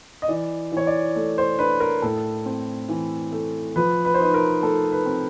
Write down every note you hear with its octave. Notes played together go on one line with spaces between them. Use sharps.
D#5
E3 D5
E3 C#5
D5
A3
C5
D4 B4
A#4
A2 A4
C4
E3
A3
F3 B4
B4
C5
D#4 B4
A#4
A3 A4
B4
C4